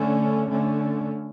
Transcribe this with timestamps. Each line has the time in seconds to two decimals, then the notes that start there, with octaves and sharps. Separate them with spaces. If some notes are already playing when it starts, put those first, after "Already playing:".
Already playing: D3 A3 C#4
0.50 D3 A3 C#4